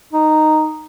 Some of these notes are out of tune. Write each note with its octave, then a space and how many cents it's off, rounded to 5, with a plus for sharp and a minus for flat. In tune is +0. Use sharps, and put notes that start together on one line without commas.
D#4 -5